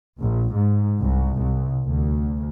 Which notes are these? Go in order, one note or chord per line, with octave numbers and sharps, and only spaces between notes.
A#1
G#2
C2
C2
D2